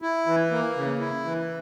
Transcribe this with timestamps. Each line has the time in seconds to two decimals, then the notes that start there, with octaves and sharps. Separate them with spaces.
0.02 E4
0.26 E3
0.51 A#3
0.76 C#3
1.00 E4
1.25 E3